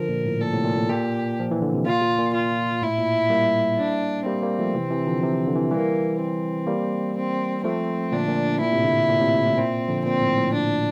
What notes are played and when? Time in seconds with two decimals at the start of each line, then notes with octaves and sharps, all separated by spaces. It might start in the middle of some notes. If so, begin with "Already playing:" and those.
Already playing: D3 F3 A#4
0.09 A#2
0.25 A2
0.41 A#2 A4
0.53 A2 C3
0.65 A#2
0.77 A2
0.89 A#2 G4
1.39 F3
1.51 E3
1.62 D3
1.74 C3
1.86 A#2 F4
2.02 A#2
2.18 A#2
2.34 F4
2.82 A2 E4
2.98 A#2
3.30 G3 A#3
3.78 D4
4.26 G3 A#3 C4
4.43 G3 A#3
4.59 F3 A3
4.75 C3 E3
4.91 C3 E3
5.07 D3 F3
5.22 C3 E3
5.47 D3
5.55 C3 E3
5.71 E3 G3 A#3
6.20 C4
6.67 G3 A#3
7.16 C4
7.63 F3 A3 C4
8.12 A#2 D3 D4
8.28 A#2
8.60 A#2 E4
8.72 A2 C3
8.84 A#2 D3
9.09 A#2
9.20 A2 C3
9.45 A2
9.56 A#2 C4
9.88 D3 F3
10.04 A#2 C4
10.22 A2
10.37 A2
10.53 D4